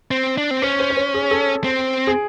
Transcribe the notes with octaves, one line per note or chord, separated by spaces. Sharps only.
C4
D4
C4
C#4 C5
C5
C#5
C5
G#4
A4
C4
G#4